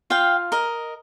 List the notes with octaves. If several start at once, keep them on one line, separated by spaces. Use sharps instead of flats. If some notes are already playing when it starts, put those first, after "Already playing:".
F4 F5 G5
A#4 D#5